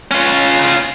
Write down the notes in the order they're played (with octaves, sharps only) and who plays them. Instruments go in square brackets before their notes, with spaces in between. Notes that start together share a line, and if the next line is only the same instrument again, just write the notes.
[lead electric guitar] C#4 F4